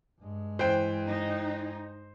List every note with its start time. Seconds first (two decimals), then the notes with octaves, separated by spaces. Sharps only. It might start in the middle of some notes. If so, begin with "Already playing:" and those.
0.20 G2 G#3
0.59 E3 C5 G5
1.07 D#4